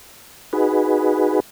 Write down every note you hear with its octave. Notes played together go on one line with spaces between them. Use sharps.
D#4 F#4 G#4 B4